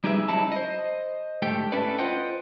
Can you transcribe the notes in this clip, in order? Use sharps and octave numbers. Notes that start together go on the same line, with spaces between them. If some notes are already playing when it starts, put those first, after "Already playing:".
G3 D#4 G4 G#4 B4 E5
C#2 C#3 F#3 D#4 E4 A5
C5 D#5
G#2 D3 A3 G4 A4 G5
C#4 D4 E4 A4 B4 D5
F4 B4 C5 D#5 F#5 G5